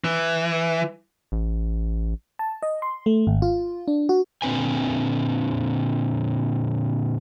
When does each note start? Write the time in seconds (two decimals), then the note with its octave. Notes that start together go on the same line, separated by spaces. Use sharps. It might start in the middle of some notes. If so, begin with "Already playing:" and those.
0.04 E3
1.32 A1
2.39 A5
2.63 D#5
2.82 C6
3.06 A3
3.27 G#1
3.42 F4
3.88 D4
4.09 F#4
4.42 A#2 D3 C4 B4 G#5